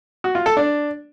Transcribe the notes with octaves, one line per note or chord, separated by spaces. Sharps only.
F#4
F4
A4
D4